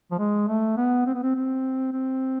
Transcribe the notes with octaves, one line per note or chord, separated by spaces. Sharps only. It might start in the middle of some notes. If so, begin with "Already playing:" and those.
F3
G#3
A3
B3
C4
B3
C4
C4
C4